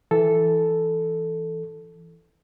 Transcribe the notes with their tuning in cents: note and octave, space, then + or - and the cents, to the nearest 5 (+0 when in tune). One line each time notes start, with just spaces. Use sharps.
E3 +5 A4 +0